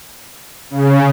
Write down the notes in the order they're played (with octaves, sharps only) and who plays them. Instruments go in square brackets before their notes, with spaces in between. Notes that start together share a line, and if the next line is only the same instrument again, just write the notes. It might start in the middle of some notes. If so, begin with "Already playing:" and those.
[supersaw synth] C#3